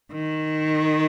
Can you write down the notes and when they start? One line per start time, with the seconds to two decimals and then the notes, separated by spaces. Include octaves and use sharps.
0.12 D#3